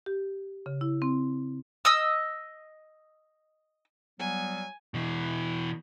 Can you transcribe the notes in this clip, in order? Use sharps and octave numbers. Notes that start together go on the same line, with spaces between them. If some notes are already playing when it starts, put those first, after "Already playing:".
G4
C#3
E4
C4
D#5 D#6 E6
F#3 G3 B3 G#5
B2 E3